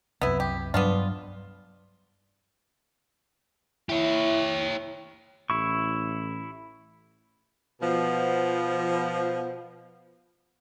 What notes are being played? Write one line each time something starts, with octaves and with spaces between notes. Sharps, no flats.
C2 F#2 B3 E4
G4
G2 F#3 G3 B3 D4 F4
E4 G4 C#5
A1 E4 C#6
B2 F3